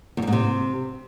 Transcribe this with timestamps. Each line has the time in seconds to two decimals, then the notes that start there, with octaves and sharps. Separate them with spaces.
0.17 E2
0.22 F#2
0.27 G#2
0.33 C3